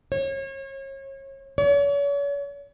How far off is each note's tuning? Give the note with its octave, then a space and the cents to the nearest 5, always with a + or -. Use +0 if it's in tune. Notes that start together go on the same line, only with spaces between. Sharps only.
C#5 -35
C#5 +40